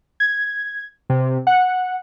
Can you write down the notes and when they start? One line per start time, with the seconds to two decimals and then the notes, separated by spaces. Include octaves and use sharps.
0.20 G#6
1.10 C3
1.47 F#5